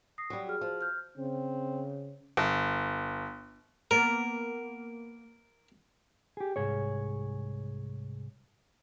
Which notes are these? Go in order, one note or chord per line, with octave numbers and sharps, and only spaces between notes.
D#6 A#6 C7
F#3 G3
F#4 G#4 F6
F3
F6 G6
C#3 C4
G1
A#3 B3 A#4
G4 G#4
C2 G#2 G#4 C#5